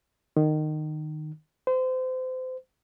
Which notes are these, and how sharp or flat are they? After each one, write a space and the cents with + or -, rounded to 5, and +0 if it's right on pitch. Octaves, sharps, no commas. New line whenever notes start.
D#3 -20
C5 -30